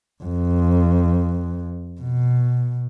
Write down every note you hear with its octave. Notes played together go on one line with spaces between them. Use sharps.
F2
B2